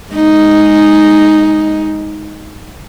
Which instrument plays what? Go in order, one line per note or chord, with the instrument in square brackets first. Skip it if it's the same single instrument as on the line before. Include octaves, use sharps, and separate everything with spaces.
[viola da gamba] G#3 D#4